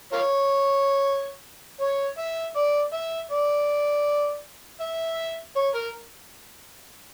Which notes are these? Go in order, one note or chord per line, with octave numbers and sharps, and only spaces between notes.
F4 A#4 C#5
C#5
E5
D5
E5
D5
E5
C#5
A#4